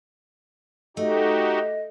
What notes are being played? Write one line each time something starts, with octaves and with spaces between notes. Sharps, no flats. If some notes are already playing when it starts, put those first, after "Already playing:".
A3 D#4 F#4 G4 D#5